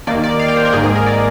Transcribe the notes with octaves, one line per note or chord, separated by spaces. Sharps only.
D#2 D#3 A#3 D5
D5
F5
G5
C5
A#4
G#1 G#2 D#3 A#3 G#4
G#4
A#4
D5